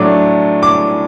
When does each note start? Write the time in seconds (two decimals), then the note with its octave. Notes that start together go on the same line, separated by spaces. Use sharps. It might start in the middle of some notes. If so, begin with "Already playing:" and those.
Already playing: A2 F#3 A3 D4 D6
0.63 D6